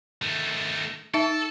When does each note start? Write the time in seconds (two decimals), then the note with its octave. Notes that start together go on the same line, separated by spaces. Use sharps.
0.22 D#3 A3
1.14 D#4 A4 E5 A5